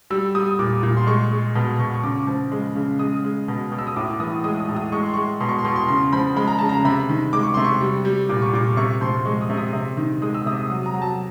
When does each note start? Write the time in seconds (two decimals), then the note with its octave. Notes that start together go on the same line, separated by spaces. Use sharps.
0.10 G3 E6
0.35 G3 D#6
0.59 A#2 D6
0.83 A#2
0.97 C6
1.07 G#3 C#6
1.31 G#3
1.55 B2
1.79 B2 C#6
1.94 C#6
2.03 C#3 D6
2.27 F3
2.52 G#3
2.75 C#3
2.99 G#3 D#6
3.24 G#3
3.48 B2
3.72 B2
3.79 E6
3.87 D#6
3.96 A2 D6
4.20 E3 D#6
4.44 G#3 D#6
4.60 D#6
4.69 A2
4.76 D#6
4.92 G#3 C#6
5.03 C6
5.14 G#3 C#6
5.40 B2 C6
5.49 C#6
5.58 C6
5.65 B2 C#6
5.76 C6
5.88 C#3 C6
6.13 F3 B5
6.36 G#3 B5
6.48 A#5
6.59 C#3 A5
6.69 A#5
6.85 C3 B5
7.09 D#3
7.33 G#3 D6
7.43 C#6
7.54 C3 C6
7.64 C#6
7.81 G3
8.05 G3
8.29 A#2 D6
8.42 C#6
8.53 A#2 D6
8.77 C3 C#6
9.01 F3 C6
9.25 G#3 C#6
9.42 D#6
9.50 C3
9.57 D#6
9.73 C3
9.97 D#3
10.22 G#3 D#6
10.34 E6
10.46 C3 D#6
10.70 F#3 D#6
10.86 A#5
10.94 F#3
11.02 A5